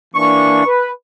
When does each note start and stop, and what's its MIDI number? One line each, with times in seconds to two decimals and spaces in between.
0.15 0.59 52
0.15 0.59 58
0.15 0.59 62
0.15 0.67 85
0.65 0.88 71